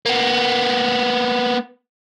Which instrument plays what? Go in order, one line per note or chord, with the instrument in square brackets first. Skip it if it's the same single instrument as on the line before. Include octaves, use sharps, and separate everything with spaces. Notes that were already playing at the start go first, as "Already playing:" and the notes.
[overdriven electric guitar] A#3 B3